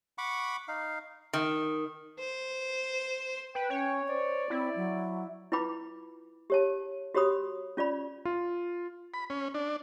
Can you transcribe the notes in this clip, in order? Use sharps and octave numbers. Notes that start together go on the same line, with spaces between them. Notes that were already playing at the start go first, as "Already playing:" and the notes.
F#5 B5 C#6 D6
D#4 F5
D#3
C5
B4 G5
C#4 C#5
C5 D5
C4 E4
F#3
E4 F4 B4 G5 B5 D6
G4 C#5 A5
F#4 G4 C#5 B5 D#6
C#4 F4 D5 B5
F4
B5
C#4
D4